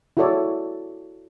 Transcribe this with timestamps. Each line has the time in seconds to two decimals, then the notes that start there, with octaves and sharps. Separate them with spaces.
0.17 E4 F#4 G#4 A4 C#5 D5